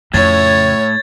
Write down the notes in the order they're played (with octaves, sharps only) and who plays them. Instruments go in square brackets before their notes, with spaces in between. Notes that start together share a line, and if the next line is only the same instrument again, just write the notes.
[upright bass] F2 C#3 [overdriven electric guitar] A2 [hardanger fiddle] C#5 [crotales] G#6 A6